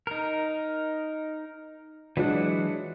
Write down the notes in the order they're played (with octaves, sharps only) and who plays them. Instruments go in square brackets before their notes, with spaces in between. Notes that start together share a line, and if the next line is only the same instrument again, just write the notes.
[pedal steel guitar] D#4 A#4
[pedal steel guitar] E3 F#3 F#5 [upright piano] G#3 D4 F#4